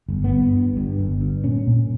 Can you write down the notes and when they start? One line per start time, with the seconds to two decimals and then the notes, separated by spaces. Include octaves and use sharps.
0.09 G1
0.24 B3
0.32 G2
0.54 G1
0.77 G2
0.99 G1
1.21 G2
1.44 A#2 C#4
1.67 A#2